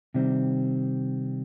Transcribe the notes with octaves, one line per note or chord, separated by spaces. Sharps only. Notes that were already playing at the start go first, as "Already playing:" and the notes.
C3 D#3 G3 C4